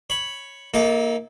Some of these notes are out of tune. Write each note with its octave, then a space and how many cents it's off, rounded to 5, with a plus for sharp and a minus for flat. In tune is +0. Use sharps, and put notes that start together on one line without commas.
C#5 +0 B5 +0
A#3 +0 D#4 +40 A4 -25